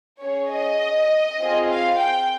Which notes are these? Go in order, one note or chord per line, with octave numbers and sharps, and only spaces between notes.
C#4 G#4 C#5
D#5
C4 F4 G#4
F5
G5